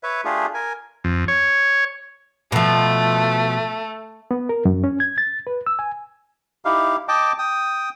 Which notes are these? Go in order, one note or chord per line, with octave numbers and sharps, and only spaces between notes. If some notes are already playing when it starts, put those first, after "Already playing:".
B4 C#5 E5
A3 D4 F4 G4 G#4
A#4 G#5
F2
C#5
B2 F3 A3
B3
A#4
F#2
C#4
G#6
A6
B4
E6
G#5
D#4 E4 G4 F5
D#5 G5 A5 D6
G5 D#6